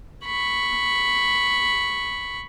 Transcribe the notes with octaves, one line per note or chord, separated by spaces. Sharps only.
B5 C#6